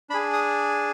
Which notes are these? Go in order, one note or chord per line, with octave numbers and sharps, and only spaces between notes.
D4 G#4 B5
D#6